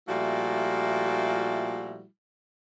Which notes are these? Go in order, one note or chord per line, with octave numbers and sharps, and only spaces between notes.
A#2 F3 G3 A3 E4 F#4